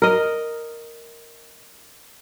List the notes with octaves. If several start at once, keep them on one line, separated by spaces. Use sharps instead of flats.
A#4 D#5